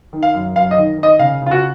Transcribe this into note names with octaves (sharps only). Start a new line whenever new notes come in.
D#3
F5
F#2
F#2 F5
D#5
D#3
D#3
D#5
C#3 F5
C#3 F4
F#4